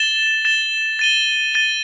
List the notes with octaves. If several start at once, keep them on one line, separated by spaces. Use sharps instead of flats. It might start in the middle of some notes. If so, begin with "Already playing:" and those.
Already playing: A6 E7 G7
A6 E7 G7
A6 D#7 G7
A6 D#7 G7